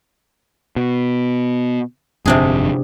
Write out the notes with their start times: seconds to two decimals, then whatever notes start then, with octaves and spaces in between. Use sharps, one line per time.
0.76 B2
2.25 G1 F2 C3 C4 D4 G#4